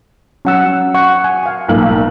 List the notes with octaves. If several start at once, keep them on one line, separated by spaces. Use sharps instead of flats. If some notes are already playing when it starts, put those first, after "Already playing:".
F#3 C#4 F#5 E6
F#5 C#6
G#5
F5 G#5
B1 A#3 F#7